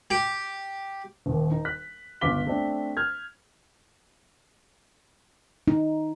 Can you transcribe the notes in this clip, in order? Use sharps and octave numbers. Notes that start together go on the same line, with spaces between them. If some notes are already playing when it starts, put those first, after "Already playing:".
G4
D#1 D#2
D#4
F#6 B6
G1 C#2 F5 D6 B6 G7
A3 C4 D4
F6 G6 G#6
D#4